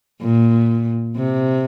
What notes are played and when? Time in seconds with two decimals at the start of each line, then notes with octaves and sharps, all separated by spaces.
0.22 A#2
1.17 C3